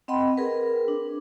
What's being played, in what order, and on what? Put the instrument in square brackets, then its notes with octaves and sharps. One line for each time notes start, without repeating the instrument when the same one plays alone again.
[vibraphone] C4 D#5 F#5 G5 B5 C6
G#4 A#4 B4
D4